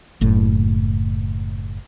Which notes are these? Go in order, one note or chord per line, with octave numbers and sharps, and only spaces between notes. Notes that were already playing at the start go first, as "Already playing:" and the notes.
F#1 A2